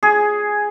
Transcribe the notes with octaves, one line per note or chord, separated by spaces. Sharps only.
G#4